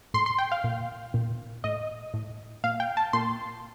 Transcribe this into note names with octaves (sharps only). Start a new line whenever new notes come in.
A2 C6
C6
G5
F5
A#2
A#2
A2 D#5
A2
A#2 F5
G5
A5
A#2 C6